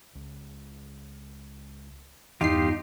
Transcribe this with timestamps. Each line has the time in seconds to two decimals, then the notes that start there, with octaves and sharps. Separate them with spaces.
0.15 C#2
2.41 E2 G2 D#4 F4 G4 C7